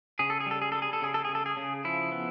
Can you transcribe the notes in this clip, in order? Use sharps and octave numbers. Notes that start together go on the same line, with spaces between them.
C#3 G#4
A4
G#4
G3 A4
G#4
G3 A4
G#4
A4
C#3 G#4
A4
C#3 G#4
A4
G#4
C#3
F3 E4
B3